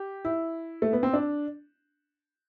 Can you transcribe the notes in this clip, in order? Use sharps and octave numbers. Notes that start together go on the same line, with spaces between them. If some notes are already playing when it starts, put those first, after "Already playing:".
Already playing: G4
E4
A3
B3
C4
D4